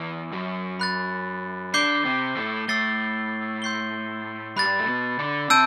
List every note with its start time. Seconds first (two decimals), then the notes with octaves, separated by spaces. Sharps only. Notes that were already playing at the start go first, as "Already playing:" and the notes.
Already playing: E2 E3
0.33 F#2 F#3
0.80 B5 F#6 A6
1.74 D3 D4 D6 G6 C7 G7
2.05 C3 C4
2.36 A2 A3
2.68 A2 A3 E6 A6 C7 G7
3.62 C6 G6 C7 G7
4.56 G2 G3 B5 F#6 A6
4.79 A3
4.87 B2 B3
5.19 D3 D4
5.50 C3 C4 A5 E6 G6 D7